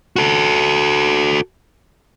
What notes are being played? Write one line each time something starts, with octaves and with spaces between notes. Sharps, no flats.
F#4 A4